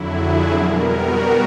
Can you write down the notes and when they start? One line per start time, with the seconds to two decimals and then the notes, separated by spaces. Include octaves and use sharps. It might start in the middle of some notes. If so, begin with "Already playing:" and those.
Already playing: F2 D3 F#3 E4
0.11 G#4
0.52 B2 G3 B3 A#4
0.96 F#4